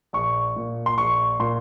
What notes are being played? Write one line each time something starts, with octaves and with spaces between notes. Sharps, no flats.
A#1 C#6
A#2
C6
A#1 C#6
A#2 C6